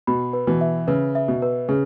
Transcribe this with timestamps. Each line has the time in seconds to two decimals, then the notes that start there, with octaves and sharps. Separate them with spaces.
0.07 B2 B5
0.33 B4
0.47 B2 E3
0.61 E5
0.88 C#3 B4
1.15 E5
1.28 B2
1.42 B4
1.69 C#3 G#4